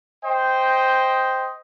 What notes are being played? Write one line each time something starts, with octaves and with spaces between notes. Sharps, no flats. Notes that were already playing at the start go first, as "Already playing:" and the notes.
C5 D#5 G5